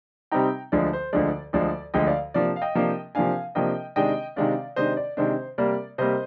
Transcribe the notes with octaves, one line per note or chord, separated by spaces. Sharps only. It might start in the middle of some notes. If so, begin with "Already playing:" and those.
C3 G3 C4 D#4 G5 A#5
D2 D3 F3 G#3 D5
C5
D2 D3 F3 G#3 D5
D2 D3 F3 G#3 D5
D2 D3 F3 G#3 D#5 G5
D5 F5
C3 F3 A#3 D4 D5
F5
D#5 G5
C3 F3 A#3 D4
C3 F3 A#3 D4 F5 G#5
C3 F3 A#3 D4 D#5 G5
C3 D#3 G#3 D4 D#5 G5
C3 D#3 G#3 D4 D5 F5
C3 D#3 G#3 D4 C5 D#5
D5
C3 D#3 G#3 D4 C5
C3 G3 A#3 D5
C3 G3 A#3 C5 D#5